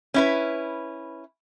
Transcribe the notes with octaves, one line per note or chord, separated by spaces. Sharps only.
C#4 E4 B4